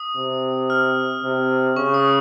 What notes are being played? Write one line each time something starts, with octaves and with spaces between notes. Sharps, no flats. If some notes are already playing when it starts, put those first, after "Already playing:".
Already playing: D#6
C3
F6
C3
C#3 C#6
D#6